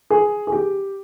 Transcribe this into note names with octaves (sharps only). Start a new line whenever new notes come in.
G#4
G#4
G4